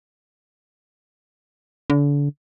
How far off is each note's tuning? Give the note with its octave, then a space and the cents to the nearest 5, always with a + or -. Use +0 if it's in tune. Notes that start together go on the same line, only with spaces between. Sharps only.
D3 -35